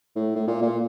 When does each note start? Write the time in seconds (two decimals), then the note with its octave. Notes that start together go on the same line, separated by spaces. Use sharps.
0.16 A2
0.36 A2
0.47 A#2
0.62 A#2